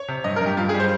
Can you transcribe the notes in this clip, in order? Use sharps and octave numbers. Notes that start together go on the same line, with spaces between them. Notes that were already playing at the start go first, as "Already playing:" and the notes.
Already playing: C#5
C3
G2 D#5
G2 A#4
G4
G2 F4
G3 G#4
C5